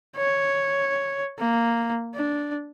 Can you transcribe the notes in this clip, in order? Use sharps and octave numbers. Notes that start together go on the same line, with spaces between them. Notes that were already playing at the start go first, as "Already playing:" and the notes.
C#5
A#3
D4